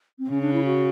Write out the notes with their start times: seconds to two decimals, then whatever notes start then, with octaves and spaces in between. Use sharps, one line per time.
0.19 C4
0.30 C#3 C#4
0.41 D4
0.53 E4
0.65 F#4